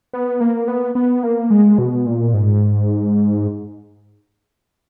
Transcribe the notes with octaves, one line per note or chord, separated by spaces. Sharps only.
B3
A#3
B3
B3
A#3
G#3
B2
A#2
G#2